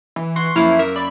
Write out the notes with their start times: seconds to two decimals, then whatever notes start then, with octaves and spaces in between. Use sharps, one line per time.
0.16 E3
0.36 F#4 C6
0.56 F#2 F3 A#3 E4 F5
0.79 A#4 E5
0.96 D5 B5